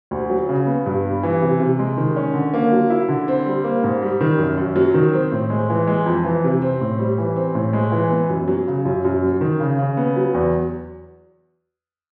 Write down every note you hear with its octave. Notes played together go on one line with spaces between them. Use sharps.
D2
F#3
C#3
B3
G2
G3
E3
C3
C3
G#3
D#3
C#4
D3
A#3
F#3
E4
D3
C4
G3
A#3
G#2
G3
D#3
F#2
F#2
F#3
D#3
C4
A2
G#3
E3
G#3
F2
E3
C3
C4
A2
G3
E3
C4
A2
G#3
E3
B3
F#2
F#3
C#3
F#2
F#2
F#3
D#3
C#3
C#3
B3
F#3
E2